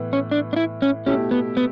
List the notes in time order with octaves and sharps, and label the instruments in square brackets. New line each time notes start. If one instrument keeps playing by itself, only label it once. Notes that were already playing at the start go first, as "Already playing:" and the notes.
Already playing: [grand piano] A2 E3 B3
[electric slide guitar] C#4
D4
D4
E4
C#4
[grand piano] B2 A3 E4 G4 [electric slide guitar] C#4
[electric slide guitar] B3
B3